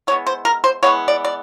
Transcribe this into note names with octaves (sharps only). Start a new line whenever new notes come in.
E3 G#3 B3 C#5
C5
A#4
C5
E3 G#3 B3 C#5
D5
D5